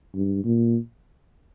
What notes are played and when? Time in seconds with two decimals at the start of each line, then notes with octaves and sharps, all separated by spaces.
0.14 G2
0.45 A#2